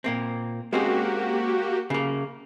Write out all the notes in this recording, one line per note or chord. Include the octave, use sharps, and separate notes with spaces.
A#2 A#3 C4
G#3 A#3 C4 C#4 F#4 G4
C#3 A#3